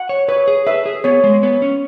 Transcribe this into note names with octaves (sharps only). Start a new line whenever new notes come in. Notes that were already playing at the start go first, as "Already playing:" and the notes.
Already playing: F#5
C#5
B4 C#5
G#4
B4 E5
G#4
B3 C#5
G#3
B3 C#5
C#4